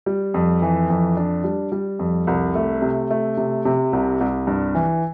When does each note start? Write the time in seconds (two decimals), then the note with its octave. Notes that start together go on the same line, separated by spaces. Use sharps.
0.06 G3
0.34 F2
0.62 E3
0.90 F2
1.17 D4
1.44 G3
1.72 G3
1.99 F2
2.27 C2
2.55 A3
2.82 C3
3.10 A3
3.37 C3
3.65 C3
3.93 C2
4.20 C2
4.47 G2
4.75 E3